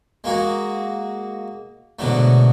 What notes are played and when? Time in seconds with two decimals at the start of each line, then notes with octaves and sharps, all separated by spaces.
0.24 G#3 A#3 F#4 G#4
1.99 G#2 B2 D3 F#3 A3